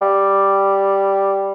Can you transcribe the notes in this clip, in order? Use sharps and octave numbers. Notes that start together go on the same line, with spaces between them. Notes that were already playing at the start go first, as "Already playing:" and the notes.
G3